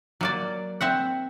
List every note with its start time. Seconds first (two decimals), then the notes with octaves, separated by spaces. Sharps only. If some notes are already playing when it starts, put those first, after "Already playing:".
0.21 F#3 A#3 D5
0.81 C4 E5 F#5